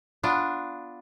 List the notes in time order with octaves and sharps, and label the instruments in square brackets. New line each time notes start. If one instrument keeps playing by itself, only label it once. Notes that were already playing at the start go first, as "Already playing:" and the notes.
[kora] B3 D4 F4